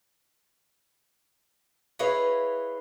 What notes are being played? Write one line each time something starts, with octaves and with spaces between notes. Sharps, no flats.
E4 G#4 B4 C#5 D#5 F5